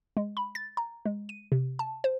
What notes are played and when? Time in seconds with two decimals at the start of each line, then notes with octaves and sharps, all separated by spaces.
0.17 G#3
0.37 B5
0.55 A6
0.77 A#5
1.06 G#3
1.29 D#7
1.52 C3
1.79 A5
2.04 C5